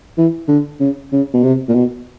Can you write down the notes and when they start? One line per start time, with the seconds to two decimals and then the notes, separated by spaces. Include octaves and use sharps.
0.18 E3
0.48 D3
0.80 C#3
1.12 C#3
1.34 B2
1.44 C3
1.69 A#2
1.75 B2